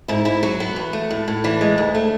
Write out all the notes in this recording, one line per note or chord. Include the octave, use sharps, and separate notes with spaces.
G#2 E4
G#2 E4
F#3 F#4
B3
E2
A3
A2
A2
E3 D4
G#3
D2
A3